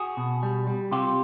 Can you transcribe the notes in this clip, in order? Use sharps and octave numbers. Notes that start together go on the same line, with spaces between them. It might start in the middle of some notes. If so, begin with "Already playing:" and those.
Already playing: F#4 G#4
B2
G3
G3
C3 F4 G4